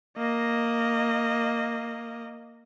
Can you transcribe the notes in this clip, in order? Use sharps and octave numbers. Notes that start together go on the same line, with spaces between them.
A#3 D#5